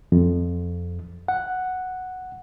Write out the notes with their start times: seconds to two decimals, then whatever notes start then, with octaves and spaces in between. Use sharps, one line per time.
0.12 F2
1.28 F#5